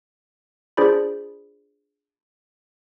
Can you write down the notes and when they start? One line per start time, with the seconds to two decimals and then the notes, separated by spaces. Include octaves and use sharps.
0.77 D4 F4 G#4 C5 D5 B5